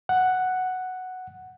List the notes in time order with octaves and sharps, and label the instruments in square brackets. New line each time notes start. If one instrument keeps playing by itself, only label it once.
[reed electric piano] F#5